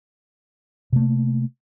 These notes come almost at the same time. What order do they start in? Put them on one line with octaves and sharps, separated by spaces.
C3 A3 A#3